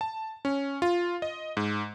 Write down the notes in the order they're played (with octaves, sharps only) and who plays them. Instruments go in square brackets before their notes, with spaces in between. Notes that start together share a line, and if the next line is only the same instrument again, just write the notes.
[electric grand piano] A5
C#4
F4
D#5
G#2